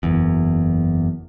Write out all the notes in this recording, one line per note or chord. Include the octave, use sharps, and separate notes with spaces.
F#1 E2